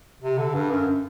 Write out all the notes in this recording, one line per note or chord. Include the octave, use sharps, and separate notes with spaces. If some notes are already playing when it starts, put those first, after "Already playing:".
C3
D3
G2
F#2